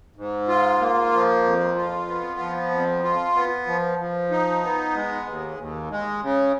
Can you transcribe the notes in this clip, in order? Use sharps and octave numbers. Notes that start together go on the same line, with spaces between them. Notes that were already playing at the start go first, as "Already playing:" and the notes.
G#2
F4
A#3
F3
F2
F4
B3
F3
F2
F4
B3
F3
F3
D#4
B3
G#3
D#2
D#2
G#3
C#3